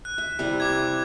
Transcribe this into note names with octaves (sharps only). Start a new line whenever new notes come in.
F#6
E5
C3 G3 E4
D6 G#6